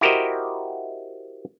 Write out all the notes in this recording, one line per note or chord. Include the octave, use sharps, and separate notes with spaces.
E4 F#4 G4 A#4 C5 D#5